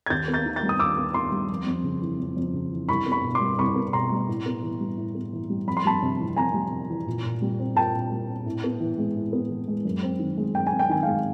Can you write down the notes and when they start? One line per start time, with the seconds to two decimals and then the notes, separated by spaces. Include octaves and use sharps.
0.06 G#6
0.10 D#2 G6 A6
0.28 B3
0.34 G6 A6
0.46 D#3
0.56 G6 A6
0.63 G3
0.69 D#6
0.79 D#2 D6 E6
0.98 B3
1.14 D#3 C6 D6
1.32 G3
1.50 F2
1.67 F2
1.84 C#3
2.02 E3
2.20 F2
2.37 F2
2.54 C#3
2.72 E3
2.89 C2 B5 C#6
3.06 B3
3.12 B5 C#6
3.24 B2
3.35 C6 D6
3.41 G3
3.59 C2 B5 C#6
3.76 B3
3.93 B2 A#5 C6
4.11 G3
4.28 A2
4.46 B3
4.63 E3
4.80 G3
4.97 A2
5.15 B3
5.33 E3
5.50 G3
5.68 F2 B5
5.77 C6
5.85 G3 A5 B5
6.02 C3
6.19 E3
6.36 F2 G#5 A#5
6.54 G3
6.72 C3
6.90 E3
7.06 A#2
7.24 A#2
7.42 G3
7.59 C4
7.76 A#2 G5 A5
7.94 A#2
8.11 G3
8.29 C4
8.46 A2
8.64 B3
8.80 E3
8.98 G#3
9.16 A2
9.33 B3
9.50 E3
9.68 G#3
9.85 F#2
10.03 C4
10.19 D#3
10.37 G#3
10.54 F#2 G5
10.67 G#5
10.72 C4
10.79 G5
10.90 D#3 G#5
11.03 G#3 F5 G5